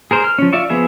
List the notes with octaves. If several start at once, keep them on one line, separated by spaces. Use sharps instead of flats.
G#4 A#4 C5
F6
F3 C#4
F4 D5 E5 C#6
F3 B3 G#4 E5